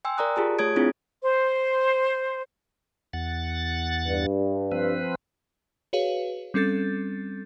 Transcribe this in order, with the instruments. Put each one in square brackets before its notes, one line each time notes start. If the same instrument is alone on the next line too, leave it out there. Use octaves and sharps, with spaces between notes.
[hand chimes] G5 G#5 C6 E6
A#4 D5 A#5 D#6 F#6
F4 G4 G#4 A5
A3 G#4 C#5 D#6 G#6 D7
C4 D4 E4 F4 G#4
[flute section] C5
[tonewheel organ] E2 F#5 A6
[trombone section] G2
[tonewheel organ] F3 C4 B4
[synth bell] F#4 G#4 B4 C#5 F5
G3 C4 C#4 A4 G6 A6